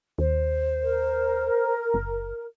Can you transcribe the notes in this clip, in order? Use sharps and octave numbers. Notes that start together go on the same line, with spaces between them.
D#2 C5
A#4
F#1